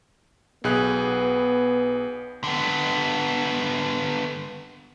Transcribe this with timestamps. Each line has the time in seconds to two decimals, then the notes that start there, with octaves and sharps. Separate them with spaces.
0.64 B1 B3 G#4 F#6
2.44 D3 B3